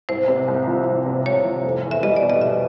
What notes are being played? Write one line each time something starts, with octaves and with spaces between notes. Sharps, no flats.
C2 C5
C3
C2
F3
C2
C3
C2 C#5
F3
F1
E2
E5
G3 D#5
D5
B2
D#5
F1 E5